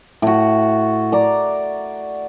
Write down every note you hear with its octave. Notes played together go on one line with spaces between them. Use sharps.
A2 F#4
D5 A#5